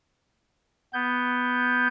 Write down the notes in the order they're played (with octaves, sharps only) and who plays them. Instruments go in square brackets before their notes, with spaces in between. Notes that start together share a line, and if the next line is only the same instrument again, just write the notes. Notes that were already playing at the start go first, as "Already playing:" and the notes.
[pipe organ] B3 G6